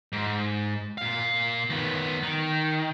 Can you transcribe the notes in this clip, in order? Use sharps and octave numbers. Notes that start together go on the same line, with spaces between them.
G#2
A#2 F5
D#3 B3
D#3